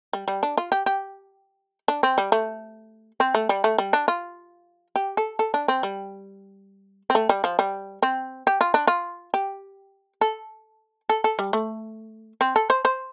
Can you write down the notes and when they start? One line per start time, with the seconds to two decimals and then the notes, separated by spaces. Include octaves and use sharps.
0.13 G3
0.28 G3
0.43 D4
0.58 F4
0.72 G4
0.86 G4
1.88 D4
2.03 C4
2.18 G3
2.32 A3
3.20 C4
3.35 A3
3.49 G3
3.64 A3
3.78 G3
3.93 D4
4.08 F4
4.96 G4
5.17 A4
5.39 A4
5.54 D4
5.68 C4
5.83 G3
7.10 C4
7.15 A3
7.29 G3
7.44 F3
7.59 G3
8.02 C4
8.47 G4
8.61 F4
8.74 D4
8.87 F4
9.34 G4
10.21 A4
11.09 A4
11.24 A4
11.39 G3
11.53 A3
12.41 C4
12.56 A4
12.70 C5
12.85 C5